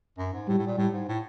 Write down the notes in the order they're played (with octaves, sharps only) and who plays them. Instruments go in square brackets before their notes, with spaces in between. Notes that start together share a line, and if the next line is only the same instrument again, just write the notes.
[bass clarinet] F#2
G#2
[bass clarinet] A2 [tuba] G3
[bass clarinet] A2
A#2
[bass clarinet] A2 [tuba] G3
[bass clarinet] G#2
A2